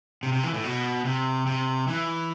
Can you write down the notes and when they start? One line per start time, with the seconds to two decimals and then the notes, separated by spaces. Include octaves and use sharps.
0.23 C3
0.33 C3
0.44 E3
0.54 A2
0.64 B2
1.05 C3
1.46 C3
1.88 E3